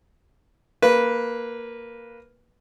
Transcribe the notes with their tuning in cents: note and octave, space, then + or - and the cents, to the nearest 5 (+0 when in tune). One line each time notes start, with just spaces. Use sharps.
A#3 +0 B4 -10